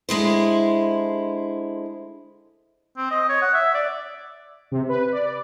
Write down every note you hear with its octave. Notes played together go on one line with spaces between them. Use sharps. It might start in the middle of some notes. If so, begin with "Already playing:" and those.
D3 G#3 E4 C5
C4
D#5
C#5
F#5
E5
D5
C3
B4
D5